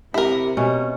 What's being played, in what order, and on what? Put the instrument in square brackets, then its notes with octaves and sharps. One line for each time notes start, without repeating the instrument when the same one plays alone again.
[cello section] C3 [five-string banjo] E4 A#4 [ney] G4
[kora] B2 C#4